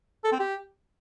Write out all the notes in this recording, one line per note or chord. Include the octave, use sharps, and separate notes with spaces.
A4
C4
G4